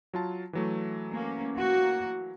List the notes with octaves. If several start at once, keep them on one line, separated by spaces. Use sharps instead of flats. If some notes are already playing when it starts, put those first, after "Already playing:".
F#3 F4 A5
E3 F#3 A3
A#3 C#4
A#3 F#4